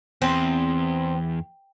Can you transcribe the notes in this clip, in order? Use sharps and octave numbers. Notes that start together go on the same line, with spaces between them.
E2 C4